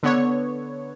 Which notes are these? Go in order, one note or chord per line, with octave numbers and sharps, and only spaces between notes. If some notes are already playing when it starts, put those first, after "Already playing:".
D3 B3 C#5